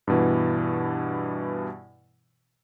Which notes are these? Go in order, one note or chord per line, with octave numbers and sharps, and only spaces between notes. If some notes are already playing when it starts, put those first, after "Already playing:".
G2 B2 E3